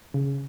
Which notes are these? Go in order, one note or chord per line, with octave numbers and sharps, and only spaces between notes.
C#3